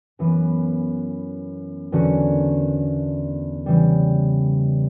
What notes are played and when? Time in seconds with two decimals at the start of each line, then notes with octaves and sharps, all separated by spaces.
0.19 F#2 E3 B3
1.92 E2 D3 A#3 C#4 F#4
3.66 C#3 E3 G3